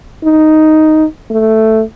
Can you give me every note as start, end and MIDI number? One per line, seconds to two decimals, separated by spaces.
0.25 1.05 63
1.31 1.82 57